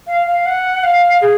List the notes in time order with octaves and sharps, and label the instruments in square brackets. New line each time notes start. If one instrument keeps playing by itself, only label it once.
[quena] F5
F5
F#5
F5
G#4